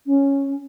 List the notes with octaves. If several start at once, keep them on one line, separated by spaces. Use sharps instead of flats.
C#4